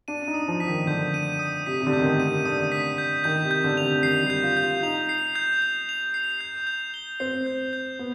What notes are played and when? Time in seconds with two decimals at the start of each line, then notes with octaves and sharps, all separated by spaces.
0.08 D4 D#7
0.28 D#4
0.34 D#6
0.48 F3
0.60 B6
0.67 D#3
0.87 D3 G6
1.14 D#7
1.39 D#6
1.66 C3 B6
1.82 C3
1.86 D3
1.93 G6
2.00 D#3
2.06 D3
2.20 D#7
2.26 C3
2.45 D3 D#6
2.72 B6
2.98 G6
3.24 D#3 G6
3.44 C3
3.51 G6
3.64 D3
3.77 F7
3.84 C3
4.03 D#3 C7
4.23 G3
4.30 G6
4.43 F4
4.57 G6
4.63 F4
4.83 D#4 F7
5.09 C7
5.35 G6
5.62 G6
5.89 F7
6.14 C7
6.41 G6
6.67 G6
6.94 G7
7.20 C4 C7
7.46 G6
7.73 G6
7.99 B3